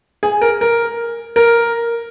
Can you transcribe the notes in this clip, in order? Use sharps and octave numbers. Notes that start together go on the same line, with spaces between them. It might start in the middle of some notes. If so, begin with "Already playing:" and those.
G#4
A#4
A#4
A#4